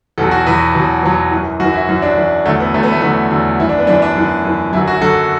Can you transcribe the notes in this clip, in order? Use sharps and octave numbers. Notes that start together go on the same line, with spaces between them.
E2 B2 F#3 A4
F#4
E2 B2 F#3 B4
E2 B2 F#3
E2 B2 F#3
E3
F#2
F#2 E3 F#4
E4
F#2 E3
D4
F#2 E3
E2 D3 F#3 A3
B3
E2 D3 F#3 A3
B3
A3
E2 D3 F#3 B3
E2 D3 F#3
F#2 E3 E4
D4
B3
F#2 E3 D4
D4
F#2 E3
F#2 E3
F#2 D3 F#3 E4
F#4
F#2 D3 F#3 A4